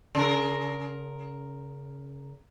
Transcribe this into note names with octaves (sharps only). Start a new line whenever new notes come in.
C#3 A#4